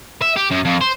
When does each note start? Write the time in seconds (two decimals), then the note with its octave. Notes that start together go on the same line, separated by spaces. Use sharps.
0.22 E5
0.36 G4
0.51 F#2
0.65 F2
0.81 C5